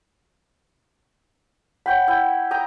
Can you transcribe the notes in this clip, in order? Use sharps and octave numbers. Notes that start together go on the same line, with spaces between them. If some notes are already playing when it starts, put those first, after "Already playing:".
C#5 F#5 G5 B5
E4 G5
D#5 G5 A#5